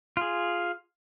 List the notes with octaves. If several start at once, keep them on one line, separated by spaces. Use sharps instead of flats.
F4 G#4